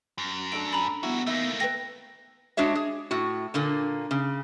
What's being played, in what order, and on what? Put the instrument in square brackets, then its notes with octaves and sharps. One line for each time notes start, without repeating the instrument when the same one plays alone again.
[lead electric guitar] F#2
[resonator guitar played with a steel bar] A3 D4 A4 [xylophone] D7
[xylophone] A#5 B5
[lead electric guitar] G3 F#4 [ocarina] B3 [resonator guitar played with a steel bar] E4
[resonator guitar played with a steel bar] E3 D#4 E5 [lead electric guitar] A3 A#3
[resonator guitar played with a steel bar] A4 G5 [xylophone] B4 A#6
[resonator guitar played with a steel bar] G#3 D4 F#4 C#5 E5
G#4
A2 F#4
A#2 D3 A#3
C#3